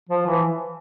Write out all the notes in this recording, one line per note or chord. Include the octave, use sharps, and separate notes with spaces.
F3
E3